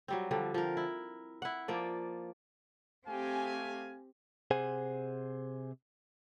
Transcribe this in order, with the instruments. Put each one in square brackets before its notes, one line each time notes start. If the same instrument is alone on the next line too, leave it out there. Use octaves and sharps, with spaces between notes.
[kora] F#3 G3 C4
D3 F3 G3
F3 A#4
E4
E4 F#5
F3 A#3 D5
[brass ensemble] A3 F5 G#5 [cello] C4 G4
[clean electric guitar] C3 G#4 C5 F#5 G#5